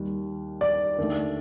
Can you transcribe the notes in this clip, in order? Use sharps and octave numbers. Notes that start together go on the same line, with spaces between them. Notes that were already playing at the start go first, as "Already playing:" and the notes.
Already playing: D#2 D#3 G3
D5
D#2 D3 A3